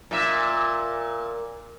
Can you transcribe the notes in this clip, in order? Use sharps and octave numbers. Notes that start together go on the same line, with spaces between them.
A#2 E5